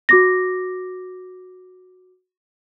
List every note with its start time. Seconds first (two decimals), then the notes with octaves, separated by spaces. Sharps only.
0.09 F#4 D6 A#6